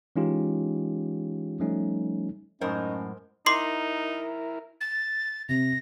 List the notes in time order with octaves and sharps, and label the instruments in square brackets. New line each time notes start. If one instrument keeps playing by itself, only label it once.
[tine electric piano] E3 G#3 C#4 D#4 F4 G4
F3 G3 A3 C#4 D#4
[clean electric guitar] F#2 A2 [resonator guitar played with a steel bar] G#3 A#4 C5 [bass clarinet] C#4 [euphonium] D#4
[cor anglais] D#4 [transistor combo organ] E4 A#4 [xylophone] C6 D6 C7
[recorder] A6
[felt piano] C3 [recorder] A#6